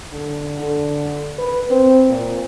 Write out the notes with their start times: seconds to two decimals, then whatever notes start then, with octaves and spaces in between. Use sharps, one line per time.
0.12 D3
0.61 D3
1.39 B4
1.71 C4
2.09 A#2